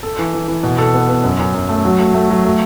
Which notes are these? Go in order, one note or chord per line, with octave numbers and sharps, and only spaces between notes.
A4
E3
E3
E3
B2
A4
B3
B3
F#2
F#2
F#2
A3
F#3
A3
A3
F#3
A3